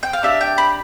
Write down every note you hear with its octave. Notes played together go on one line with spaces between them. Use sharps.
G5
F5
D4 G4 E5
G5
B5